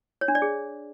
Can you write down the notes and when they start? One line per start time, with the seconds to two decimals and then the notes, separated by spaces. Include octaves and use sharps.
0.21 C#5
0.28 D4
0.35 D5
0.42 G#4